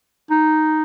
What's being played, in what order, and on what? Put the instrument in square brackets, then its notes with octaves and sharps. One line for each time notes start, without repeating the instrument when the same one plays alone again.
[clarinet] D#4